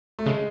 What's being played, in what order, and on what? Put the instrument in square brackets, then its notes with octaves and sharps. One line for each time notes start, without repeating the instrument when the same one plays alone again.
[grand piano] A3
[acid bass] C#3 [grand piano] G#3